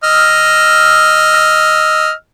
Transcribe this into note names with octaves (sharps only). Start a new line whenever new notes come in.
D#5 E6 F6